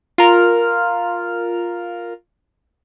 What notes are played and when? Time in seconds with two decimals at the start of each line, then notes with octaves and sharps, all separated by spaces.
0.18 F4 A#4 F6